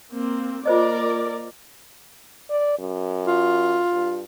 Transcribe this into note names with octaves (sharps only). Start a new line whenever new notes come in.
A#3 C4
A#3 F4 A#4 C5 D5 D#5
D5
F#2
F4
G2